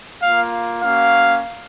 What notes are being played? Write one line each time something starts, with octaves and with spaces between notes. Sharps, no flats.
A#3 F4 F5
A#3 C#4 F#4 F5